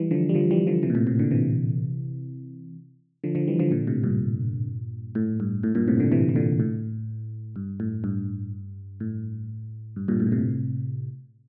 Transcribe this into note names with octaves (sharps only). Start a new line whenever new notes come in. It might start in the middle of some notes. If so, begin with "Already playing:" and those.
Already playing: E3 G3
D3 F3
G3
D3 F3
E3 G3
D3 F3
C3 E3
A#2
A2 C3
A2 C3
A#2 D3
C3 E3
D3 F3
D3 F3
E3 G3
D3 F3
A#2 D3
A2 C3
G2 A#2
A2
G2
A2
G2 A#2
A2 C3
A#2 D3
C3 E3
E3
A#2 D3
A2
G2
A2
G2
A2
G2
G2 A#2
A2
A#2
A2 C3